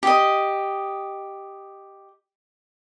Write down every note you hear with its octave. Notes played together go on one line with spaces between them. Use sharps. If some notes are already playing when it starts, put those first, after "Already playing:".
G4 D#5